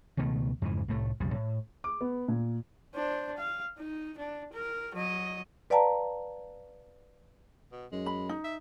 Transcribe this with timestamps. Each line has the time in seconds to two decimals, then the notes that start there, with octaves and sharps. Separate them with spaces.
0.17 C#2 B2 D#3 A3
0.62 F2 G#2 C#3 E3
0.88 C2 A2 A3
1.20 B1 F2 C#3 G3
1.34 A2
1.84 D6
2.01 B3
2.28 A#2
2.95 D4 C5
3.37 F5
3.77 D#4
4.18 D4
4.53 A#4
4.95 F#3 D#5
5.70 B4 D5 F5 G5 A5 A#5
7.72 B2
7.92 F#2 G#3
8.06 B5
8.29 D#4
8.44 E5